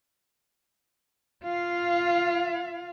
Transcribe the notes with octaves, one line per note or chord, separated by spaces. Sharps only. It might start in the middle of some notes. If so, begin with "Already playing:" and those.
F4 F5